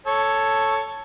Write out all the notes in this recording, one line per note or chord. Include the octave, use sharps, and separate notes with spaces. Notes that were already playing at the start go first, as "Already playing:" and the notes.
A4 C#5